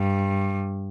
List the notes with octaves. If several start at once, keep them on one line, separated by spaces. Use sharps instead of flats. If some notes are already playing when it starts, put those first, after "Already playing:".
Already playing: G2